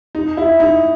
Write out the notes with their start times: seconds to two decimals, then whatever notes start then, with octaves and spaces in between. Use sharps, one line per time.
0.15 D#4
0.37 E4
0.60 D#4